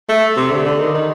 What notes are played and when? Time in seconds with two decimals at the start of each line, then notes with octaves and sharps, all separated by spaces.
0.09 A3
0.37 C3
0.51 D3
0.65 D3
0.79 D#3
0.94 D#3